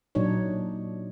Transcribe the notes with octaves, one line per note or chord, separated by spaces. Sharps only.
A#2 F#3 D4 D#4 C#5